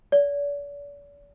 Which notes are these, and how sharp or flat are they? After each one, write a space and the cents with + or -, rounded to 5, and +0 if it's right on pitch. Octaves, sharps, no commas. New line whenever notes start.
D5 -40